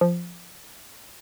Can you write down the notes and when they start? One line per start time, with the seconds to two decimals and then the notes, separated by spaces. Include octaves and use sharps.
0.01 F3